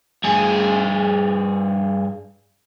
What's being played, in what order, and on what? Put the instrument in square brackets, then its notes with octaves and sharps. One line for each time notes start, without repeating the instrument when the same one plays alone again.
[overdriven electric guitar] G2 G#4